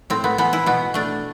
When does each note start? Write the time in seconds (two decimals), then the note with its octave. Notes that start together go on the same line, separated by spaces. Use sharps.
0.10 A2 C4
0.24 B3
0.38 E3 B3
0.53 E4
0.66 B2 B3
0.94 A3 D4